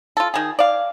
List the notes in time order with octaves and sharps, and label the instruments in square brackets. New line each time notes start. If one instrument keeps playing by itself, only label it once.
[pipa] F4 A4
D#3 G#4
D5 F5